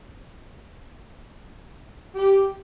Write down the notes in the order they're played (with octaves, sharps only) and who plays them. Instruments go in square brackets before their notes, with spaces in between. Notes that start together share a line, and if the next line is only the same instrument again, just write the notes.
[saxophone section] G4